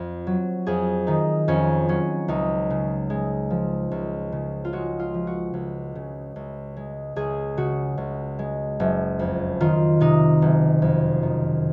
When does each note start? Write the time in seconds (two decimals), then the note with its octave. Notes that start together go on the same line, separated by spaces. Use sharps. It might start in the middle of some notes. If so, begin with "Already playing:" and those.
Already playing: F2 C5
0.27 F#3
0.66 F2 G#4
1.07 D#3 D#4
1.48 F2 C#4
1.89 F#3 C#4
2.28 C#2 D#4
2.70 C#3
3.10 G#3
3.50 F3
3.91 C#2
4.32 C#3
4.65 F4
4.73 G#3 F#4
4.99 F4
5.14 F3
5.27 F#4
5.54 C#2
5.95 C#3
6.36 C#2
6.77 G#3
7.16 C#2 G#4
7.57 C#3 F#4
7.98 C#2
8.39 G#3
8.80 F#1
9.19 F2
9.61 D#3 F4
10.00 C3 D#4
10.42 F#1
10.82 F2
11.23 D#3